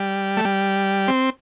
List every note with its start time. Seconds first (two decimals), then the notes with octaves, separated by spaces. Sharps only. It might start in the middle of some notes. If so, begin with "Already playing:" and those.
Already playing: G3
0.37 A3
0.45 G3
1.08 C4